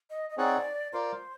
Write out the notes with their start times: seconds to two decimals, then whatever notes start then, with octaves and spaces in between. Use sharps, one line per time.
0.10 D#5
0.30 D#5
0.37 C4 D#4 G#4 C#5 D5 F#5
0.93 F4 A#4 C5 D5